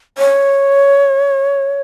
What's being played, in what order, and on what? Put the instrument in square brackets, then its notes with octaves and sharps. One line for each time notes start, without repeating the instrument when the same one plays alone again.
[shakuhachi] C#5